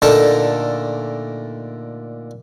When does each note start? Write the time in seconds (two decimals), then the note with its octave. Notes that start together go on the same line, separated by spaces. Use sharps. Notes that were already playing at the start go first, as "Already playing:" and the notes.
0.02 A#2 D3 A3 D#4 A#4 A5